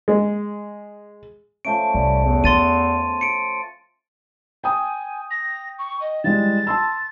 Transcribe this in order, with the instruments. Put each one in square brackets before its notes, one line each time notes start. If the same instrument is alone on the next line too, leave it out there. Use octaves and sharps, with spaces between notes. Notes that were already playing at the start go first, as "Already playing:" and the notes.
[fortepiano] G#3
[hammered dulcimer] F3 A3 C#4 [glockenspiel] D7
[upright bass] C2 [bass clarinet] G3
[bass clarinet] E2
[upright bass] B3 [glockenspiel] C6 A6 D#7
[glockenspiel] C#7 D7
[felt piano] G5 D#6 [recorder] G#5
[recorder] A#6
C#6
D#5
[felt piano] E3 G3 G#3 [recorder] A6
[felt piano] A5 C6 E6